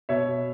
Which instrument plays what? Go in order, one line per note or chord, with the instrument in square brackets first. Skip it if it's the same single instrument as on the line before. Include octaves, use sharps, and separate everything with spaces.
[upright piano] B2 C#5 E5